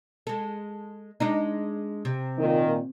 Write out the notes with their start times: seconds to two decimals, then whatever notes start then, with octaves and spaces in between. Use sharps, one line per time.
0.27 G#3 A4
1.20 G#3 D4 D#4
2.05 C3
2.39 A#2 D#3